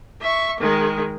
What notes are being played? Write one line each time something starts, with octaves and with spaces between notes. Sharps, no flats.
E5 C#6
D#3 G#3